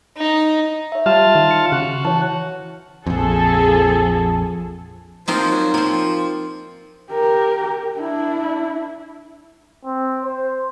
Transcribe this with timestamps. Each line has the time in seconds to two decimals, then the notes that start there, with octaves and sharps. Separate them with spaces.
0.17 D#4
0.92 C#5 E5
1.06 G3 F4 A5
1.35 D#3
1.51 C#7
1.72 C#3 F#4
2.05 E3 C#5 A5
3.06 A#1 F2 F3 G#4 A4
5.28 F3 A#3 C4 D#4
5.51 F#3
5.74 F3 A#3 C4
7.12 G4 A#4
7.97 D4 E4
9.85 C4
10.24 C5